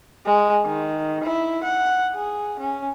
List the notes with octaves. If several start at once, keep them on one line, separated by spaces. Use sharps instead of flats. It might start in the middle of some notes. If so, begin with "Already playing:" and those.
G#3
D#3
E4
F#5
G#4
C#4